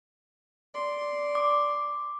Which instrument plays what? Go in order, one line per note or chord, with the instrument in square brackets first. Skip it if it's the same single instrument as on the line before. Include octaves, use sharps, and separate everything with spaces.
[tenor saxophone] D5 [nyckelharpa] C6
[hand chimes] D6